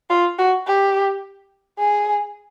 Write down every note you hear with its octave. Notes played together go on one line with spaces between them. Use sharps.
F4
F#4
G4
G#4